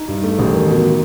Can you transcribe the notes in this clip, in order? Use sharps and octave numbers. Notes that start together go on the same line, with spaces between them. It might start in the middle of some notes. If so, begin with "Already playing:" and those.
Already playing: D#4
G2
A3
A1
D#3
B2